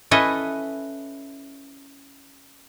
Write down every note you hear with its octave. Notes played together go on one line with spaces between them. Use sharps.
C#4 E4 A4 B4 D#5